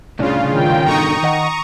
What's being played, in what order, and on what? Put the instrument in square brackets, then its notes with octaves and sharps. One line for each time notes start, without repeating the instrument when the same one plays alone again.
[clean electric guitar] C2 A2 D4 [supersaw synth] C#3 F4
[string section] D#3 G5
[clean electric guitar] G2 B2 D3 [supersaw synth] A#5 C#6 D#6
[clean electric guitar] D#3 D#5 F#5